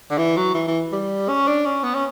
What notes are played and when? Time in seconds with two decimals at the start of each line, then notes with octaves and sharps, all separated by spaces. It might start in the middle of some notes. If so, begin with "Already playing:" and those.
0.11 D3
0.18 E3
0.37 F#3
0.54 E3
0.68 E3
0.92 G3
1.29 C#4
1.47 D4
1.66 C#4
1.84 B3
1.95 C#4